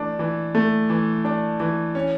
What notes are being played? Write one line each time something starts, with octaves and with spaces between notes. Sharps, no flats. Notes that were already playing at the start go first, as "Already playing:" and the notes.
Already playing: E3 A3 D4
E3
A3
E3
D4
E3
C#4